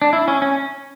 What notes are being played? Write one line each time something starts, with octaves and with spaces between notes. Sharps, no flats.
D4
E4
C#4
C#4